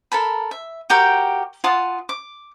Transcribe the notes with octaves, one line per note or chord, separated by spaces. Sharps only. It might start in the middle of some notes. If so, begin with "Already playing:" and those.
A4 A#4 A5 B5
E5
F#4 G4 A#4 G5
F4 F#5 A5 D#6
D6